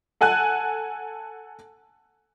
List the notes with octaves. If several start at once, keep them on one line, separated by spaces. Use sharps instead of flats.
A4 F#5 G#5 A5 F#6